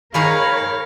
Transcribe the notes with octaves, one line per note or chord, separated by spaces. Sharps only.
D#3 G#4 A#4 C#5 F5 A#5 B5